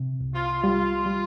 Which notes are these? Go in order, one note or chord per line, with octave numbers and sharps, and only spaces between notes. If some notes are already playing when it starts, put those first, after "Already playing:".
Already playing: C3
C2
F4
G3 F4
G3